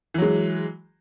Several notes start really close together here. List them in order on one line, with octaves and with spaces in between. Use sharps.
E3 F#3 G#3